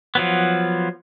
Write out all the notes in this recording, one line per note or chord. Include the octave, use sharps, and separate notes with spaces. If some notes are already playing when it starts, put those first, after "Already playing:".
F3 F#3 B3